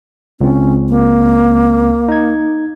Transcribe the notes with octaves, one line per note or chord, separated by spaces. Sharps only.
C#2 C4 C#4
A#3
D#4 G#6